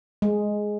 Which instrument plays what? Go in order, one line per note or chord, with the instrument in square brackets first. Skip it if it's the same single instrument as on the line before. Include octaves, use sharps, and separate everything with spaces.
[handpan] G#3